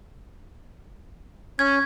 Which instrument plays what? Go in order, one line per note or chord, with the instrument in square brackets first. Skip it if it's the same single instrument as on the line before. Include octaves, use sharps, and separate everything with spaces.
[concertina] C#4 [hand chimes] G#6